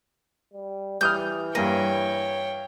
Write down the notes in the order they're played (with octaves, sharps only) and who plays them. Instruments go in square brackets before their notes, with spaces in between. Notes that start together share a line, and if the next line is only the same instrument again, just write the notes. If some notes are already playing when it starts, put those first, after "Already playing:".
[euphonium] G3
[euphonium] E3 [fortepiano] G3 D#6 F6 [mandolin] G6
[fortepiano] G2 A#3 [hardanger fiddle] C#5 G5 [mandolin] D#5